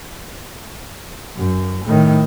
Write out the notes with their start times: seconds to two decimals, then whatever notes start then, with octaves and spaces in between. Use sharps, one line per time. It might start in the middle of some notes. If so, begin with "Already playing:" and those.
1.36 F#2
1.85 A2 D#3